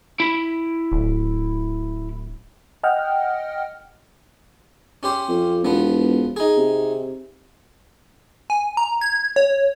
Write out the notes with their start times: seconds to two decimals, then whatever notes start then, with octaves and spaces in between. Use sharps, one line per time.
0.20 E4 B5
0.92 D1
2.83 D#5 F#5 G5 F6
5.03 C#4 G4 C5
5.29 F2
5.65 E1 F3 B3
6.36 D#4 G#4
6.58 C3
8.50 G#5
8.77 A#5
9.01 G#6
9.36 C#5